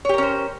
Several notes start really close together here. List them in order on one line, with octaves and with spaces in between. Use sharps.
C#5 G4 A#4 C#4 C5